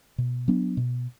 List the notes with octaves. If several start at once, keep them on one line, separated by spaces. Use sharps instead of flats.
B2
F#3 B3 D4
B2